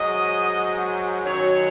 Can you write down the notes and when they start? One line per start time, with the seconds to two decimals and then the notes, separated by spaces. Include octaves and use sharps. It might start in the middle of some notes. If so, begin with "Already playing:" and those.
Already playing: G#2 F#3 D#5
1.25 F#2 D#3 F#3 C#5